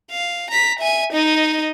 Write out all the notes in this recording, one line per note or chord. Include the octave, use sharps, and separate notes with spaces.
F5
A#5 B6
E5 G#5
D#4 D#5